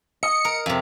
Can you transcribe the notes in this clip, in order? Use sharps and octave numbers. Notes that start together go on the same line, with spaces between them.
D#5 C#7
A#4
F2 C3